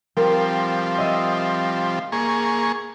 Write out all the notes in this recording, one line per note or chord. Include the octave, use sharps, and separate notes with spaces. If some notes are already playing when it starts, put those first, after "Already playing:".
F3 G3 C4 A#4 G5
D#5 E5 D#6
A#3 G#4 C#6 G6